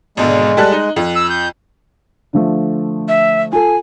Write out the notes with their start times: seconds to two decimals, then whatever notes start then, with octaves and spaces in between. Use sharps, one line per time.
0.17 G#1 B2 D3 G#3
0.57 G3 A4 F#6
0.72 D#4
0.96 F2
1.16 E6
1.30 G6
2.33 D3 F3 A3
3.08 E5
3.52 F4 A4 G#5